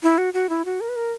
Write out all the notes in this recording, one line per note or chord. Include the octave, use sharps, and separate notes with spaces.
E4
F#4
F#4
E4
F#4
A#4
B4
A#4